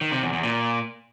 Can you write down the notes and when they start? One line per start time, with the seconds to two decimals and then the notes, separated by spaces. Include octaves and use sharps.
0.01 D#3
0.12 C3
0.22 E2
0.33 E2
0.43 A#2